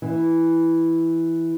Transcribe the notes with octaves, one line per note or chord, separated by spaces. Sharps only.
E3